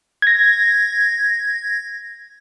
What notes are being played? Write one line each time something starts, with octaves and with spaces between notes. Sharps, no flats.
G#6 A#6